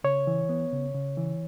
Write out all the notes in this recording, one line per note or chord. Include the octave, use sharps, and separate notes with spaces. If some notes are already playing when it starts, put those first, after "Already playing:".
C#3 C#5
E3
B3
C#3
C#3
E3